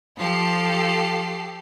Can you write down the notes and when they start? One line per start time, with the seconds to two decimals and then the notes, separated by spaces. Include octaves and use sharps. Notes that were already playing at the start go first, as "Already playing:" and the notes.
0.19 F3 G4 A4 C7